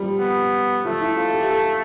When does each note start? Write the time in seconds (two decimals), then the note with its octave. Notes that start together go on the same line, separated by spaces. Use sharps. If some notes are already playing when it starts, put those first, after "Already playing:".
Already playing: F3 G3
0.19 B3
0.85 F3 A3
1.01 E4
1.17 F4
1.34 G4
1.50 A4